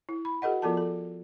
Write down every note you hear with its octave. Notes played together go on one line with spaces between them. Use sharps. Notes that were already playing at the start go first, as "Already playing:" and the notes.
E4
B5
F#4 G#4 A#4 D#5 F#5
F3 B3 F4 A4 A#4 A5
A4